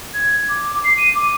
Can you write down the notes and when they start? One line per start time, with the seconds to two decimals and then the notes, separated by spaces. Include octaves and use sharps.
0.14 G#6
0.49 D6
0.68 D6
0.84 C7
0.98 D#7
1.15 D6